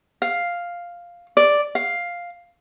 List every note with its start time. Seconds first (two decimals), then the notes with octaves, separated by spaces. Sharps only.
0.22 F5
1.37 D5
1.75 F5